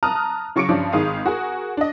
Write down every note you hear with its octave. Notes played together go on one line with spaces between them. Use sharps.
A5 A#5 D#6 F6 F#6
C#3 F#3 C#6 D6 C#7 D7
G2 F3 C#4 D4
G#1 D#3 G#3 F5 D#6
F#4 G#4 A#4
D4 D#5